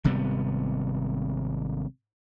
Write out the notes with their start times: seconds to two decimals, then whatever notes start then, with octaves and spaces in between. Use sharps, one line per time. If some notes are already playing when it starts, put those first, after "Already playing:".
0.04 G#1 C3 G3 B3